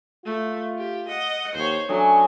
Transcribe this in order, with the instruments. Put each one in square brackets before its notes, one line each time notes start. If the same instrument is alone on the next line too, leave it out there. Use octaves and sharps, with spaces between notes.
[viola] A3 [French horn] F4
[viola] G4
D#5 F#5
[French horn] D#2 [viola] C5 C#5
[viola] F#3 [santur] A3 C#4 D#6 [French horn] D4